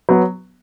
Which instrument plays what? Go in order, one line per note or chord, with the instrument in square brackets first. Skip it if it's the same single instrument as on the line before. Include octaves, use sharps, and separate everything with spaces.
[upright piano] F#3 B3